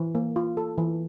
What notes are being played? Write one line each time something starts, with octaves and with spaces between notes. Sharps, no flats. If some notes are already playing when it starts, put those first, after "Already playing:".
Already playing: E3
A#3
F4
A4
E3